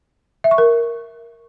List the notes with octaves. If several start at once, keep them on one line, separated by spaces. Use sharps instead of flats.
E5
C#6
A#4